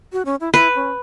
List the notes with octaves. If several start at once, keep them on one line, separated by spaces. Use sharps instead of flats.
F#4
C#4
E4
E4 B4
C#4